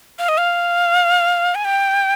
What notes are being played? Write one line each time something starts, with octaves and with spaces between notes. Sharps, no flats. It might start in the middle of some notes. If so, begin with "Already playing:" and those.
F5
D#5
F5
G#5
G5